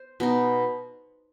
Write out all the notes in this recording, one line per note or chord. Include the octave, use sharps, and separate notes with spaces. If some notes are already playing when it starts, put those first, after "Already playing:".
Already playing: C5
B2 B3 D#4